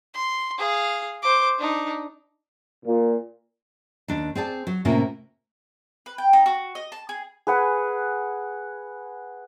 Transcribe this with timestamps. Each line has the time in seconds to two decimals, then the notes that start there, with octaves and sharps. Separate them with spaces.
0.15 C6
0.58 G#4 F5
1.22 C5 D6
1.58 D4 D#4
2.86 A#2
4.08 D#2 D4
4.35 C4 G#4 D5 A5
4.67 F#3
4.85 A2 C3 A#3 C#4 F4
6.06 B4
6.18 G5
6.33 D#4
6.46 F#4
6.75 D#5
6.92 A5
7.09 G#4
7.47 G#4 B4 F#5 G#5